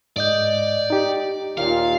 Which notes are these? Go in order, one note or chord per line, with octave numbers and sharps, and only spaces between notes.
G#2 D5 D#5 G6
D#4 G4
D#2 A#2 F4 F5